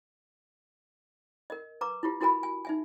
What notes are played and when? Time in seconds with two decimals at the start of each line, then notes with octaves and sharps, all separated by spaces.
1.50 A#4 D#5
1.81 B4 A#5 D6
2.03 E4 F4 G4
2.21 E4 F#4 A#4 G#5 B5
2.43 G#5
2.65 D#4 E5 G#5